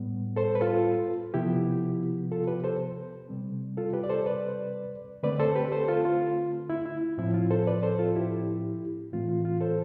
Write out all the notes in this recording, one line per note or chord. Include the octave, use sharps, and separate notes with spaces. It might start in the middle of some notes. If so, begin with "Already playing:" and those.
Already playing: A2 G3 B3
A4 C5
B4
F4 A4
C3 F3 B3 E4 G4
F4 A4
G4 B4
A4 C5
C3 G3 C4
F4 A4
G4 B4
D5
A4 C5
B4 D5
D3 A3 C4 B4 D5
A4 C5
G4 B4
A4 C5
F4 A4
F4
E4
E4
A2 F3 C4 E4
F4
A4 C5
B4 D5
A4 C5
F4 A4
E4 G4
A2 E3 A3 C4 F4
F4
F4
A4 C5